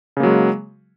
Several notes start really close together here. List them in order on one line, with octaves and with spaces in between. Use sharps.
C#3 A#3 F#3 G#3